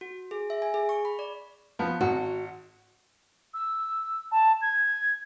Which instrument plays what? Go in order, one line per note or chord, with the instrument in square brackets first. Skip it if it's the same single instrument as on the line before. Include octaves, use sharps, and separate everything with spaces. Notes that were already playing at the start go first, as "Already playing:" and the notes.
[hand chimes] F#4
G#4
E5
G#5
G#4
C#6
B5
D5
[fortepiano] F3 B3
[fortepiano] G#1 [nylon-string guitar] F#4
[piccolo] E6
A5
G#6